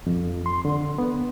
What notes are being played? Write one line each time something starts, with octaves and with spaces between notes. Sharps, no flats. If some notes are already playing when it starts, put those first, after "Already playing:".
F2
C6
D3
B3